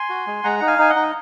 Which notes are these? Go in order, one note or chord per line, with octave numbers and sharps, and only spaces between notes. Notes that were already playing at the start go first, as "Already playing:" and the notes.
Already playing: G#5 C6
F#4
G#3
G#3 F#5 A#5
D#4 F#5
F5 G#5
D#4 G#5
D#5 F#5
D#4